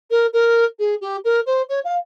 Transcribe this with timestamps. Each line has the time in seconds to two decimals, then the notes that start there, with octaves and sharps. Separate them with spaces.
0.11 A#4
0.33 A#4
0.79 G#4
1.01 G4
1.25 A#4
1.46 C5
1.69 C#5
1.85 F5